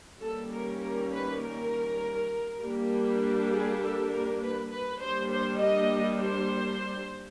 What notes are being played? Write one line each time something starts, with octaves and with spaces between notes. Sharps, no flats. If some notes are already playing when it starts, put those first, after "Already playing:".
D#3 G3 A#3 C#4 A4
A#4
A#4
B4
A#4
G3 A#3 D4
G#4
A4
A#4
B4
B4
G3 A#3 D4 C5
C5
D#5
C5